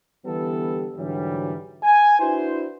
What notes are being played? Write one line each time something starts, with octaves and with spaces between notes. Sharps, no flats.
D3 E3 G3 B3 A4
G#2 D3 E3 F#3 G3
G#5
D4 E4 F#4 B4 C5